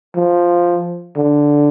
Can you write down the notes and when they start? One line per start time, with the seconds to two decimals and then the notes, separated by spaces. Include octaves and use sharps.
0.16 F3
1.16 D3